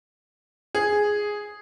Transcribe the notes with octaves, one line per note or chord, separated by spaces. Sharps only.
G#4